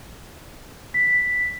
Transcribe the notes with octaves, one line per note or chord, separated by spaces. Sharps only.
B6